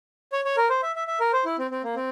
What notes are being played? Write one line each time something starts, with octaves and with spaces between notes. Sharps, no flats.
C#5
C#5
A#4
C5
E5
E5
E5
A#4
C5
E4
C4
C4
A#3
C4